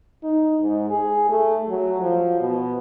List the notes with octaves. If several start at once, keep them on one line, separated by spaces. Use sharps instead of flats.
D#4
G#2
G#4
A3
F#3
F3
B2